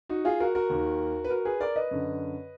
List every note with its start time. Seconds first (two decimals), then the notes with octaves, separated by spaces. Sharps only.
0.09 D#4 F#4
0.25 F4 G#4
0.40 F#4 A#4
0.55 F#4 A#4
0.70 D#2 D#3
1.24 B4
1.30 F#4 A#4
1.45 G#4 B4
1.60 A#4 D5
1.76 B4 D#5
1.91 F#2 D3